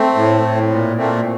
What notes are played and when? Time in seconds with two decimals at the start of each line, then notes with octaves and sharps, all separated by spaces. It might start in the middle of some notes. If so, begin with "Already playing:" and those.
Already playing: A3 C4
0.15 A2
0.42 A2
0.70 A#2
0.97 A#2 A3 C4